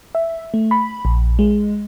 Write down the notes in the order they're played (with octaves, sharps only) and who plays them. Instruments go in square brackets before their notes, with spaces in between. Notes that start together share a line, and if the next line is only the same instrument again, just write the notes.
[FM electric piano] E5
A3
B5
A#1
G#3